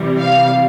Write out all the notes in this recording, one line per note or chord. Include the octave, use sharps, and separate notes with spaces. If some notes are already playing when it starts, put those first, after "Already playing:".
Already playing: C3 E3 G3
F5